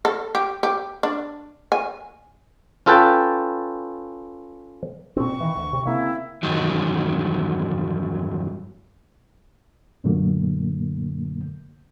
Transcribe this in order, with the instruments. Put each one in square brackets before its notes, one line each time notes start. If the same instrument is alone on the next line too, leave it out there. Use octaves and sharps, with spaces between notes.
[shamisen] A4
G4
G4
D4
G#5
[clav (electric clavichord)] C#4 F4 A4 B4 G5 A5
[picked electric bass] A#2 C4 [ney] C#6
[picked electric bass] D#3 E3
D2
C3
[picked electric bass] C#3 A#3 C4 [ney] E4
[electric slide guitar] E2 G2 D#3 F#3
[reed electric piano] F#2 A#2 D3 F#3 A3 A#3